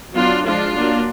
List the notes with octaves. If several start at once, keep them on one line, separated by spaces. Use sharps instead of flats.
F#3 B3 D4 F4
F3 G#3 D4 F4
F#3 A#3 D4